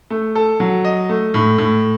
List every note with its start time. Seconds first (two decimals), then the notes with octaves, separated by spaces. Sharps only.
0.10 A3
0.35 A4
0.60 F#3
0.85 D#5
1.09 A3
1.34 A2
1.58 A2